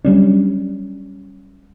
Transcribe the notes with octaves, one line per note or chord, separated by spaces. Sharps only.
F#3 G3 C#4 D4